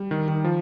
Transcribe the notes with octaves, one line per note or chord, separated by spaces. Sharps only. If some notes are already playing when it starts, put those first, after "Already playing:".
Already playing: G3
D#3
D#3
F3